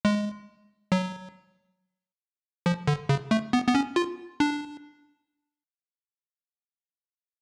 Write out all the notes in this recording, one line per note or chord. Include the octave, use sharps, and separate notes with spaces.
G#3
F#3
F3
D3
C#3
A3
B3
B3
C#4
F4
D4